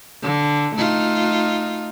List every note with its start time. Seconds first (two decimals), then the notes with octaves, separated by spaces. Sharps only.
0.22 D3
0.76 A3 D#4 F4